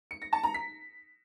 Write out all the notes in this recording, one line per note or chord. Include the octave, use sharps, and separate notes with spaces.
C#7
A#6
A5
A#5
B6